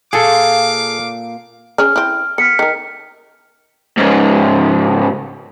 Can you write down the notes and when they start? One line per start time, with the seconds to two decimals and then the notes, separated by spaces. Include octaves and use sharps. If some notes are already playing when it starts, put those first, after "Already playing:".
0.13 A#2 A#3 G#4 A4 F5 D6
1.78 C#4 G#4 C#5 F6
1.96 C4 E4
2.38 B3 F6 B6 C#7
2.59 D#3 A#4
3.97 C#2 G#2